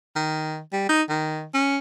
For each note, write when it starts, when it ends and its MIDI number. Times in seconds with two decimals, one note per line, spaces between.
0.16 0.60 51
0.73 0.88 55
0.89 1.02 63
1.09 1.46 51
1.54 1.78 61